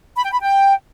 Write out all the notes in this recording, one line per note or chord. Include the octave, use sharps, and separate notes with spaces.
B5
G5
B5
G5